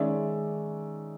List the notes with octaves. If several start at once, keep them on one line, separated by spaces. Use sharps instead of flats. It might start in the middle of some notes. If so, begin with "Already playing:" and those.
Already playing: D#3 G#3 C#4 D5 E5